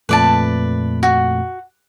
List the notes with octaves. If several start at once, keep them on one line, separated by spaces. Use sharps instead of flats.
F2 A#2 A3 B4 D5 A5
F#4